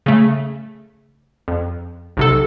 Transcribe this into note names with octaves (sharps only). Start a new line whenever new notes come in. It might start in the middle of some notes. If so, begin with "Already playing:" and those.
C#3 A3
F2
B1 C3 A4